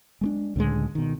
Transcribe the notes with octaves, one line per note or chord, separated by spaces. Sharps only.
G#3 A3 D4
C#2 A2 D3 G#3
B2 D#3